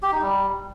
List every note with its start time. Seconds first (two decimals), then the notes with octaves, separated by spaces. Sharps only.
0.03 G4
0.12 D#4
0.22 G3